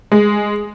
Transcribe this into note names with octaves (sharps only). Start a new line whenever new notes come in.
G#3